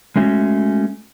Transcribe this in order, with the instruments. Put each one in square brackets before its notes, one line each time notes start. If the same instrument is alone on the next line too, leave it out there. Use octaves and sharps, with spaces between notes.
[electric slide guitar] G#3 A3 C#4 F#4